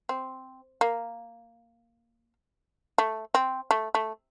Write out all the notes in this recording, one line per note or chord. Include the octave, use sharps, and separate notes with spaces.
C4
A#3
A3
C4
A3
A3